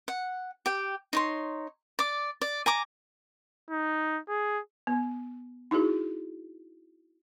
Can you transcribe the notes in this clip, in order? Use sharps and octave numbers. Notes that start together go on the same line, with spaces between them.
F#5
G4 G5
D#4 C#5 C6
D5 D6
D5
G#5 A#5 D6
D#4
G#4
B3
D#4 E4 F#4 G#4